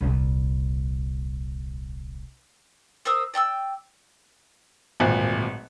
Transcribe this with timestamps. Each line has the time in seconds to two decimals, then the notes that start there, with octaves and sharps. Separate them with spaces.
0.01 D#1 C2
3.05 A#4 C5 D#6 E6
3.34 D5 G5 C#6 E6
5.00 D1 G#1 A#2 F#6